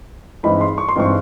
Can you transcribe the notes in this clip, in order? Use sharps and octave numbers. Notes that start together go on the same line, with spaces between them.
G2 E3 G#3 C4 D#4 B5
C6
C#6
C6
G2 E3 G#3 C4 D#4 C#6